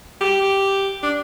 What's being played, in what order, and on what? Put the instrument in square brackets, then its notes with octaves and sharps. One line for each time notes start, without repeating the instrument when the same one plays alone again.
[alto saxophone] G4
D4